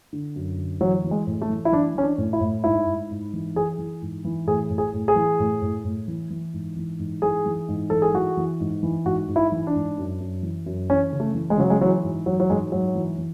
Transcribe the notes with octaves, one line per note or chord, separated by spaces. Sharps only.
D3
F#2
D3
E3 F#3
E3
G#3
A2
A3
E3
E4
E3 D4
E3 C#4
D4
A2
E4
A2
G#2 E4
G#2
G#2
E3
E3 G#4
E3
G#2
E3
A2 G#4
A2
G#4
A2
G#4
E3
A2
A2
A2
E3
E3
G#2
E3
G#2
E3 G#4
E3
G#2
E3 A4
G#4
E3 F#4
E3
G#2
E3
G#2 F#4
G#2
E4
E3
D4
G#2
F#2
F#2
E3
F#2
E3 C#4
C#3
A3
E3
G#3
C#3 F#3
G#3
E3 F#3
G#2
E3 F#3
F#3
G#2 G#3
G#2 F#3
E3
E3